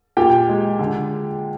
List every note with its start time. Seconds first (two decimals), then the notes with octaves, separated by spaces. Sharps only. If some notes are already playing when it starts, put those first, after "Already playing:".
0.17 A#2 G4 G5
0.49 G#3
0.79 D3